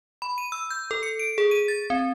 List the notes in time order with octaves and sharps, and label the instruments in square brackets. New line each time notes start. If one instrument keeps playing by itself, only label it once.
[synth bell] B5
D#7
E6
G6
A4
C#7
D7
G#4
D#7
A6
C4